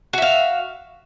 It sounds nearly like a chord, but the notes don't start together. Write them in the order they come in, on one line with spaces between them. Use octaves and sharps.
F#4 E5 F5